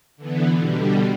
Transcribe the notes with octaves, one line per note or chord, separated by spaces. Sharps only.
D3 E3 B3
B2 D3 G3